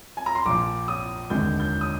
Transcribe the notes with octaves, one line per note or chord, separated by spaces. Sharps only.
G#5
A#5
C6
A#1 A#2 F3 D6
D#6
F1 D#2 D3 G#3 G6
G6
D#6